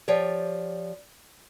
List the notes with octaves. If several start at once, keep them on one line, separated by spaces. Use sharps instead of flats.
F3 G4 C#5 D5